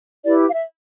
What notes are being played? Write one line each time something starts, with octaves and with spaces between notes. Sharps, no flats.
E4 G4 B4 D5
F5
E5